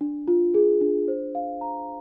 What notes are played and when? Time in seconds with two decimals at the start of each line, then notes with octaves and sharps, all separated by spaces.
0.01 D4
0.28 F4
0.54 G#4
0.81 D4
1.08 C5
1.35 F5
1.61 A#5